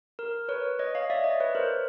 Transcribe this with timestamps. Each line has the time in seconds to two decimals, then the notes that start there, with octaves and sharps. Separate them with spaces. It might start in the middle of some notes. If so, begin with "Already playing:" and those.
0.19 A#4
0.49 B4 C#5
0.79 C#5 D#5
0.95 D#5 F5
1.10 D5 E5
1.24 C#5 D#5
1.40 B4 C#5
1.55 A#4 C5